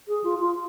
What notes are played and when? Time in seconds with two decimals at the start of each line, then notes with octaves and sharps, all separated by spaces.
0.08 G#4
0.24 F4
0.40 F4